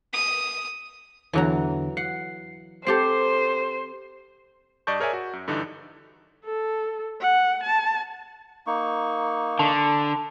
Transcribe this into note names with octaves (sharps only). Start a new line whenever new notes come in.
D#6
E2 D3 E3 F#3 A#5
F#5 C7
C4 G4 A4 C5 C7
G2 D5 D#5 A5 C#6 G6
G#4 A#4 C#5 D5 E5 G#5
F#4
F#2
G2 D3 E3 D4 D#4
A4
F#5
A5
A#3 D#4 C#6
D3 A5